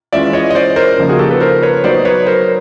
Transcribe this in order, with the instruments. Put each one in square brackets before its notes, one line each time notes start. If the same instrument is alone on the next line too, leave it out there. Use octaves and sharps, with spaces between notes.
[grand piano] E3 G#3 C#4 F4 [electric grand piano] D5 E5
[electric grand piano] C#5 D#5
D#5
C5 D5
A#4 C5
[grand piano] C#3 F3 A#3 D#4
[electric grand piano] F#4 G#4
G4 A4
A4 B4
A#4 C5
B4 C#5
[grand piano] F#3 B3 D#4 [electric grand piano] C5 D5
[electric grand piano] B4 C#5
A#4 C5